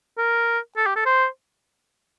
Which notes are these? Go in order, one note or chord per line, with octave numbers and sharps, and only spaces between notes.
A#4
A4
G4
A4
C5